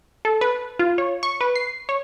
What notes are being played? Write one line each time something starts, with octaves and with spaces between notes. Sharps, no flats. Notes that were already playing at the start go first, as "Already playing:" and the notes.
A4
B4
F4
C#5
C#6
B4
C7
C#5